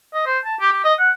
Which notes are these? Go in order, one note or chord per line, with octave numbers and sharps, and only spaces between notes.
D#5
C5
A5
G4
G4
D#5
F#5